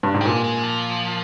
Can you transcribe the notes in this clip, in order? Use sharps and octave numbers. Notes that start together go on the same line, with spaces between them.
G2
G#2
G3
A#2 G#3
G#3
F3